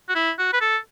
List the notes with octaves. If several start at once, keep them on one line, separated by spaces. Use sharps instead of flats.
F#4
E4
F#4
B4
A4